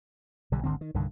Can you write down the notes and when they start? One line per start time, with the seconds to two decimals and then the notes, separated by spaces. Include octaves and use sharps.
0.52 B1 D3 G3
0.63 G#1 D2 D3 C4
0.81 D#3
0.94 C2 G2 D3 D#3